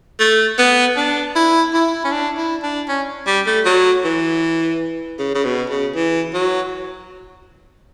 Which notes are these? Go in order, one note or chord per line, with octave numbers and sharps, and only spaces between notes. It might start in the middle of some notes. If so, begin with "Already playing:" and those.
A3
B3
D4
E4
E4
C#4
D4
E4
D4
C#4
G3
A3
F#3
E3
C#3
C#3
B2
C#3
E3
F#3